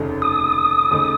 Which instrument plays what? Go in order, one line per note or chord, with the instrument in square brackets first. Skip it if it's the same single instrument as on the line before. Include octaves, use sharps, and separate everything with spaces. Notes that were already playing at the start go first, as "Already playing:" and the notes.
Already playing: [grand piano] F1 D#2 C#3 A3 D#4
[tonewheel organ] D#6
[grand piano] D#2 C#3 A3 D#4